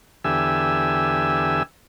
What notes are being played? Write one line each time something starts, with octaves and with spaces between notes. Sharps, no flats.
E2 D3 G4 E5 G#5 E6